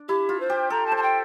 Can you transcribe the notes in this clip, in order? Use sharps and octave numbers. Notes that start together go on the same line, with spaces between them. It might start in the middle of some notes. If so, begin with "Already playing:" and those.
Already playing: D4
E4 G4
F4
C5
G4
A4 A#5
A5
C5
A5
G5